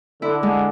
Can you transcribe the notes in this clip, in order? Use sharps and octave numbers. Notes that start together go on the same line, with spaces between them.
D3 E4
G#3